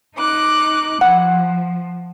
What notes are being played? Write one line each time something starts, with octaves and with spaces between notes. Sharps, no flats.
D#4 D6 F#6
F3 F#5